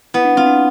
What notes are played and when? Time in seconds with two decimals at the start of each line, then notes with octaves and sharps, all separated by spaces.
0.14 B3 E4
0.25 D4
0.36 C4 F4
0.46 D4